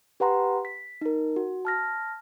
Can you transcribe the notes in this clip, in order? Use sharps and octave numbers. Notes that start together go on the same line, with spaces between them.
G4 B4 F#5 A#5 C6
B6
D#4 A#4
F#4
A5 F6 A#6